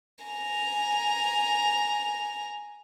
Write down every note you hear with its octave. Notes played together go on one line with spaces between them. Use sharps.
G#5 A#5